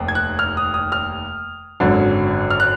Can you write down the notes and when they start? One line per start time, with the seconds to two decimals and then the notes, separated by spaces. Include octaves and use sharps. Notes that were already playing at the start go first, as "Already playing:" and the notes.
Already playing: F1 D#2
0.08 G#6
0.15 F#6
0.39 F6
0.57 D#6
0.74 D#6
0.92 F6
1.80 G#1 F#2 D3 F#3
2.51 F6
2.60 F#6